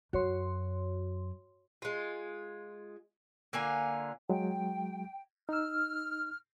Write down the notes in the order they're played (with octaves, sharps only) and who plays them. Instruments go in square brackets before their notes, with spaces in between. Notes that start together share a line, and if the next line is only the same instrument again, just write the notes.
[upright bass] F#2 [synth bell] F#4 C#5 C6
[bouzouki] G#3 F4
D3 A#3 F4 G#5
[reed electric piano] F#3 G#3 [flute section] G5
[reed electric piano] D#4 E6 [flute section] F6